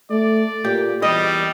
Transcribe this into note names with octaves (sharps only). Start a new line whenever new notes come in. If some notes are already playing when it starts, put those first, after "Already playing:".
A3 D5
A#2 G4
E2 G3 D#5